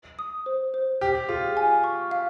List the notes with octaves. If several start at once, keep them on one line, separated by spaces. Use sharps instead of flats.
D#6
C5
C5
G4 G5
F4 G#4
G#5
C#6
F5